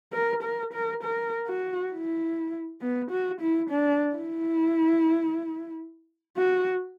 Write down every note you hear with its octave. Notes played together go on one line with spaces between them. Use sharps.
A#4
A#4
A#4
A#4
F#4
E4
B3
F#4
E4
D4
E4
F#4